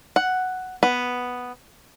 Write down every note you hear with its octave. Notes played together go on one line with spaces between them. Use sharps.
F#5
B3